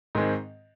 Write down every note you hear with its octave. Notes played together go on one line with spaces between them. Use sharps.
G#2 D#3 G#3 C4